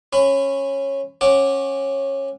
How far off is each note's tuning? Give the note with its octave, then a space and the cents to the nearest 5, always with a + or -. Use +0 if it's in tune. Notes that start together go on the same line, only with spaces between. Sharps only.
C#4 -15 B5 +25
C#4 -20 F#5 +0 D6 +0